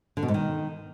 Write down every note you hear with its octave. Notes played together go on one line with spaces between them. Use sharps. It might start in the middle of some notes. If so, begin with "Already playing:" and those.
D3
B2
G#2
D#3